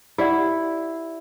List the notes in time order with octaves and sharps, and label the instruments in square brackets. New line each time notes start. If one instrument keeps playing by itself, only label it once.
[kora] E4 [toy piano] G4 D5 F#5